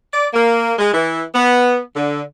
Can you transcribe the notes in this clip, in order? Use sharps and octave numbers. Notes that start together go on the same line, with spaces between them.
D5
A#3
G#3
E3
B3
D3